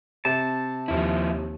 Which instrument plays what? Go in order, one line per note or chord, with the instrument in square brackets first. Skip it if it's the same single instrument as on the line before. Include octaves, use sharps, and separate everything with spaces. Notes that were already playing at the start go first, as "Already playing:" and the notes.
[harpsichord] C3 [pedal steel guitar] A5
[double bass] D#2 [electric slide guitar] F3 E4